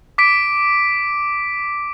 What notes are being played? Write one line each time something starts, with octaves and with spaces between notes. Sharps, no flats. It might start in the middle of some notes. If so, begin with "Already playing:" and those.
D6 B6 D7